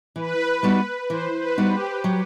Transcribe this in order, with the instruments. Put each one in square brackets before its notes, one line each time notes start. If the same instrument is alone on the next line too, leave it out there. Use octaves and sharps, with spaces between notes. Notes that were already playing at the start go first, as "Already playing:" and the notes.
[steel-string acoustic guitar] E3 [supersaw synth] B4
[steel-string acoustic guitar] G3 B3 D#4 F#4
[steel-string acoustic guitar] E3 [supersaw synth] C5
[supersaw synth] B4
[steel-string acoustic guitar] G3 B3 D#4 F#4
[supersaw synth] G4
[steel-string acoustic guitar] F#3